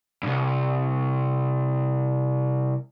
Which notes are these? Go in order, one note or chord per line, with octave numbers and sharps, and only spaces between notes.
C2 G2